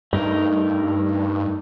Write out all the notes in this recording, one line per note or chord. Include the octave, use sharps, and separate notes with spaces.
G2 A3 D#4 A#4